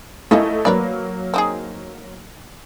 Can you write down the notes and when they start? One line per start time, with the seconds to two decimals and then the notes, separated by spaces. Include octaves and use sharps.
0.31 F3 A3 A#3 C#4 E4 D#5
0.65 F#3 A#3 A#4 B4 D5
1.34 C4 D#4 G#4